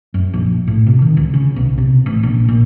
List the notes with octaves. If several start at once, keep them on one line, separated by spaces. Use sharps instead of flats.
F#2
A#1
A2
C3
D#3
C#2
C#3
B1
C3
A1
A#1
A#2